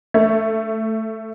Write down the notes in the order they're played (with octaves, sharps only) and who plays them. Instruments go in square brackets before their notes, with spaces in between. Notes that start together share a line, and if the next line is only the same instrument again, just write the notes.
[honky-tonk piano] A3